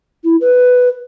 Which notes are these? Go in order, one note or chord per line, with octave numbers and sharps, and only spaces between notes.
E4
B4